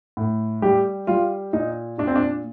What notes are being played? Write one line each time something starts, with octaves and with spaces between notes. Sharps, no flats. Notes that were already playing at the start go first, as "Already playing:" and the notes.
A2
G3 G4
G3 F4
A#2 D#4
A#2 D4
C4
D4